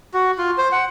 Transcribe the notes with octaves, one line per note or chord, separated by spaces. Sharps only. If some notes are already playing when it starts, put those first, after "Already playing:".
F#4
F4
C5
F#5